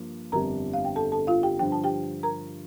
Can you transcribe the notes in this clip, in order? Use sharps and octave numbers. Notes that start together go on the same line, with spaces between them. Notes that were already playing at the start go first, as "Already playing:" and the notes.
Already playing: G2 F3 A#3
G1 F2 D3 G3 D4 A#4 A#5
F5
G5
A4 A5
A4 A5
F4 F5
G4 G5
G2 D3 F3 G5
A5
G4 G5
A#4 A#5